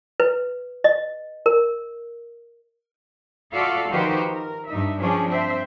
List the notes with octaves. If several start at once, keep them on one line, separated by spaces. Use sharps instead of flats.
B4
D#5
A#4
F4 F#4 A4 D5 E5 F5
D#3 F3 F#4 G4 B4 C5
A#4
G2 D#4 E5
F3 C#4 D4 G#4
C4 C5 E5